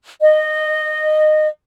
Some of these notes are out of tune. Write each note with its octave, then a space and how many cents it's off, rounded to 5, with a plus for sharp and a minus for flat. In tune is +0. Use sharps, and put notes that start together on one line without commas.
D#5 -15